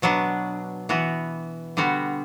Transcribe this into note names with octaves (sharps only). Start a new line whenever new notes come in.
B2 F#3 B3 D4
E3 B3 F#4
D3 G3 B3 F#4